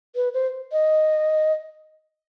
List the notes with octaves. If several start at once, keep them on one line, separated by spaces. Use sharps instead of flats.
B4
C5
D#5